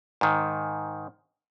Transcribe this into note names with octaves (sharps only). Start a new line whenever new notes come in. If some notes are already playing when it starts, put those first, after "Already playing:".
G#2 D#3